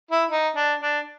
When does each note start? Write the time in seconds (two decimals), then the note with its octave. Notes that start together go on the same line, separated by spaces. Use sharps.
0.11 E4
0.30 D#4
0.56 D4
0.82 D4